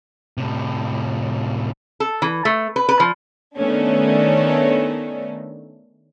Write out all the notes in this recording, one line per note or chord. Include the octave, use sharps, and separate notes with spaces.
A2 C3
A4
E3
A3
B4
B4
F3
D#3 A3 B3 C#4 D4